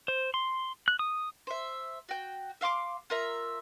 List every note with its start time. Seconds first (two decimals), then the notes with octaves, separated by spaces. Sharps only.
0.08 C5
0.34 C6
0.88 F#6
0.99 D#6
1.47 C5 E5
2.09 F#4 G5
2.61 E5 F5 C6 D6
3.10 F4 A#4 E5